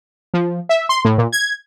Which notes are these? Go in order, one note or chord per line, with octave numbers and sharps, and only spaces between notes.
F3
E5
C6
A2
A#2
G#6